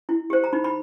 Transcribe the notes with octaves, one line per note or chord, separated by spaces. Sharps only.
E4
G4 C5
A#5
D#4 B5
B5